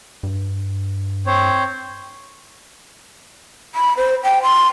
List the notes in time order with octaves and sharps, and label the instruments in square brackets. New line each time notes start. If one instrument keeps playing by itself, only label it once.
[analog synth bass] G2
[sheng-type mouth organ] C4 C5 C#5
[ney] B5
C5
G5
C6